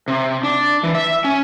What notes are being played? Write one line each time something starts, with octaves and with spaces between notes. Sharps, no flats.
C3
D4
E3
E5
C#4